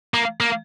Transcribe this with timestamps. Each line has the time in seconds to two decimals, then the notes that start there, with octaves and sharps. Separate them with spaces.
0.14 A#3
0.40 A#3